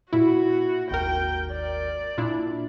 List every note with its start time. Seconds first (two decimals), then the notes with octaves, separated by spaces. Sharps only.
0.13 A#2 E4 F#4
0.91 G#1 D#2 A#4 G5
1.53 D5
2.18 A#2 D4 E4